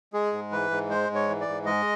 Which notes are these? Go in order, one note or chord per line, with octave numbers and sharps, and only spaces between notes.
G#3 G#4
G#2
E3 B4
G#2
G#3 C5
G#2
C#5
E3
D5
G#2
G#3 D#5